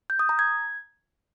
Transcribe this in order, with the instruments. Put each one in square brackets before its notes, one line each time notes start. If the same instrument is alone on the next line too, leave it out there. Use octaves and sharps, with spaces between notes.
[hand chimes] G6
D#6
A#5
G#6